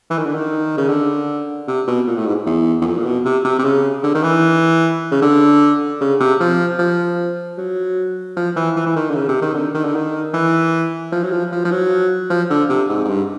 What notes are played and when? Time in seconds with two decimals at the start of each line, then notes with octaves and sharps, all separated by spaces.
0.10 E3
0.18 D#3
0.26 D3
0.35 D#3
0.77 C#3
0.89 D3
1.68 C3
1.87 B2
2.07 A#2
2.17 A2
2.27 G#2
2.46 E2
2.81 E2
2.86 F2
2.97 A#2
3.06 B2
3.25 C3
3.45 C3
3.59 C3
3.64 C#3
4.03 D3
4.15 D#3
4.23 E3
5.11 C#3
5.22 D3
6.01 C#3
6.20 C3
6.40 F3
6.79 F3
7.58 F#3
8.36 F3
8.56 E3
8.76 E3
8.86 E3
8.96 D#3
9.10 D3
9.15 C#3
9.28 C3
9.42 D#3
9.54 D3
9.74 D#3
9.84 D3
9.95 D#3
10.33 E3
11.12 F3
11.23 F#3
11.31 F3
11.52 F3
11.65 F3
11.71 F#3
12.30 F3
12.50 D3
12.69 C3
12.89 G#2
13.05 G#2
13.09 G2